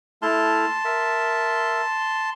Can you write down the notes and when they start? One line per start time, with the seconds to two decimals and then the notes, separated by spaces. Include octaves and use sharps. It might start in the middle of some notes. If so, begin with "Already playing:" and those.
0.22 A3 E4 A5 C6 F6
0.85 A#4 E5